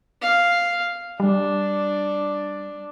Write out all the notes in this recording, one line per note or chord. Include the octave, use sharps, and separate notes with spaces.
F5
G3 D4